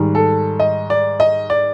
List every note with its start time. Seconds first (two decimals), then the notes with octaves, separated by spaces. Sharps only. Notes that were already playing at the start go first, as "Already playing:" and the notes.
Already playing: G#2 D#3 G3
0.15 A4
0.60 D#5
0.90 D5
1.20 D#5
1.50 D5